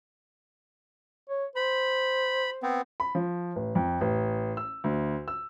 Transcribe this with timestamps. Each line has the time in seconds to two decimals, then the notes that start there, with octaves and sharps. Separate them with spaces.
1.30 C#5
1.56 C5 B5
2.63 B3 C4
3.00 B5
3.15 F3
3.56 A1
3.75 F2
4.01 A1
4.57 E6
4.84 D2
5.28 E6